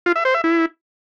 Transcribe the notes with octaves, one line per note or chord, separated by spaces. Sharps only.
F4
E5
C5
E5
E4